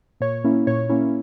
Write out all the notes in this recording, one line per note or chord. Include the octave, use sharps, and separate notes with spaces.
A#2 C#5
A#3 C#4 E4
A#2 C#5
A#3 C#4 E4